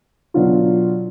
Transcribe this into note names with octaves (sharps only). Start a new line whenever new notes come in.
B2 F#3 D4 F4